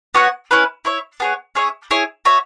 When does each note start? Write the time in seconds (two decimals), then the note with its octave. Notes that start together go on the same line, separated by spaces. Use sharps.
0.14 B3 F#4 C#5 F#5
0.51 C#4 E4 B4
0.85 E4 C#5 E5
1.20 B3 G#4 C#5
1.55 C#4 G#4 C#5 E5
1.91 E4 G#4 C#5
2.25 F#4 C#5 E5